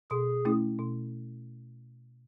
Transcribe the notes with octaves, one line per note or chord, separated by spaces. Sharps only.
B2 G#4
A3 C#4 E4
B2